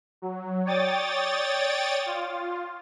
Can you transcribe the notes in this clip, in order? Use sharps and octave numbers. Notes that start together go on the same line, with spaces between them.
F#3
C#5 D5 G5 D#6 A6
F4